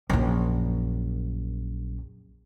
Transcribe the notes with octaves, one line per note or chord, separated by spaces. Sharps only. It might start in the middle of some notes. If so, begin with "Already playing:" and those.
A#1 F#2